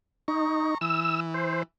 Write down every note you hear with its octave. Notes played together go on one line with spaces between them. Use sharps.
D#4 A#5 C#6
E3 E6
C5